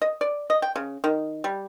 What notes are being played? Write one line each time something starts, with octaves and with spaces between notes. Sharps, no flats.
D#5
D5
D#5
G5
C#3
D#3
G3